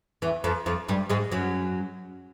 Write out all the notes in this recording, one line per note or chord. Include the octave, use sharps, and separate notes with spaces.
E2 E3
F2 F3
F2 F3
G2 G3
G#2 G#3
F#2 F#3